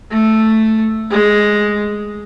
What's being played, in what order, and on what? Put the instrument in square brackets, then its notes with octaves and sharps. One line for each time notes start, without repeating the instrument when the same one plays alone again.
[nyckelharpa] A3
G#3